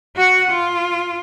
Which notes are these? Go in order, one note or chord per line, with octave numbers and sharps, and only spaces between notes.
F#4 F#5
F4